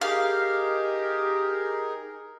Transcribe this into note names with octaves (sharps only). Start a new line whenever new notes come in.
D#4 G4 G#4 A#4 F5